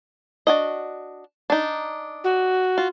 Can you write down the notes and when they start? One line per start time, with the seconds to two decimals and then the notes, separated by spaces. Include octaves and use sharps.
0.47 D4 F#4 D#5
1.50 D4 D#4
2.24 F#4
2.78 F4